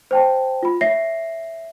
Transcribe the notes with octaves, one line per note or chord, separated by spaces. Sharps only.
C5 G5 A5
F4 B5
C#5 E5 A#6 C7